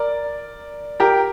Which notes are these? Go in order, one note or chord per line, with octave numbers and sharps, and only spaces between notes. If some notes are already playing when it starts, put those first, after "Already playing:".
Already playing: A#4 D5
G4 A#4